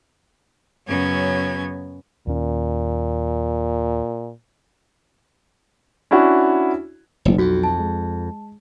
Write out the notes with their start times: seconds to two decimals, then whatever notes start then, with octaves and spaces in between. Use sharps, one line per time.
0.87 F#2 C#3 F#3 B3 C#4 G#6
2.27 D#2 A#2 C#4
6.11 C#4 D4 E4 F#4
7.25 F#1 B1 F#3
7.38 F2 F#4
7.64 A5
7.77 G#3